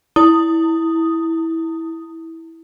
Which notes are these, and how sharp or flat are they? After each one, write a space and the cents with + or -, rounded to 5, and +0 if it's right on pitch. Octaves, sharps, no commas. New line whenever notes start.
E4 -10 D#6 +0